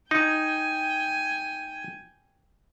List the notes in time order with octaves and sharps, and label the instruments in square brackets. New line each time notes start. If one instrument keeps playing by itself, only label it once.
[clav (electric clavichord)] D#4 [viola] G5 G#5